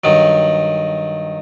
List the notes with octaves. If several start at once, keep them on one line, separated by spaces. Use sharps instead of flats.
G2 D#3 F#3